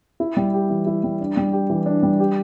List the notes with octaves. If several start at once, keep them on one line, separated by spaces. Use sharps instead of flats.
E4
G3
G4
E3
E4
G3
D4
G3
G4
E3
D4
G3
G4